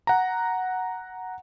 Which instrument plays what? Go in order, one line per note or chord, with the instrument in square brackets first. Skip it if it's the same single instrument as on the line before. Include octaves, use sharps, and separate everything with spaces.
[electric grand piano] F#5 A#5